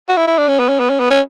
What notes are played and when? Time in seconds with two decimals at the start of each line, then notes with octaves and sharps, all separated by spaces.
0.09 F#4
0.17 E4
0.27 E4
0.38 D4
0.48 C#4
0.59 B3
0.69 C#4
0.80 B3
0.90 C#4
1.00 B3
1.10 C#4